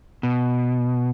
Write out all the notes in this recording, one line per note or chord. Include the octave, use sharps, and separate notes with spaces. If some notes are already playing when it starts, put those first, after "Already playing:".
B2